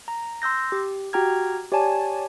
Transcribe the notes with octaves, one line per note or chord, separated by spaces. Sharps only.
A#5
C6 E6 G6 A#6
G4
F#4 G4 G5 A#5 F6 G#6
G4 C#5 D5 G#5 A5